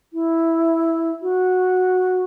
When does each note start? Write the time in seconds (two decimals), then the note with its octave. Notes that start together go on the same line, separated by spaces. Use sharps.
0.13 E4
1.22 F#4